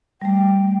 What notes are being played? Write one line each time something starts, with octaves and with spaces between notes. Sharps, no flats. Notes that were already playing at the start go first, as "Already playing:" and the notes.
G3 A3 G5